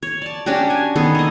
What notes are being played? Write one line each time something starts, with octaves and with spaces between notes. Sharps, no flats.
C#5
D5 A5
C#4 D4 F#4 G4
G#5
D#3 B3 G#4 A4
A#3 D#5